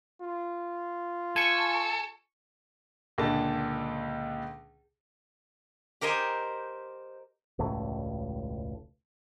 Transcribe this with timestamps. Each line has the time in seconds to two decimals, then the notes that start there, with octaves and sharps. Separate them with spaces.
0.21 F4
1.36 A4 G#5 C#6
3.18 C#2 A#2 D3 A5
6.01 G4 A#4 C5 D#5 G#5
7.59 E1 C#2 A2